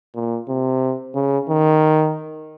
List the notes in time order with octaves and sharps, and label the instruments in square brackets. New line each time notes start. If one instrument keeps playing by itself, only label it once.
[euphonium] A#2
C3
C#3
D#3